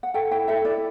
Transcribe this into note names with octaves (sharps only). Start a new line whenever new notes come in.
F#5
A4 G5
E4 G5
A4 E5
E4 D5